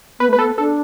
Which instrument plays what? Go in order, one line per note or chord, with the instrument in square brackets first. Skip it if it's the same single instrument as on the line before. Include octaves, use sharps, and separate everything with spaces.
[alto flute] B3 [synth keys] B4
[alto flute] A3
[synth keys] B4
[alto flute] B3 [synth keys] A4
[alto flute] D4 [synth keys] A4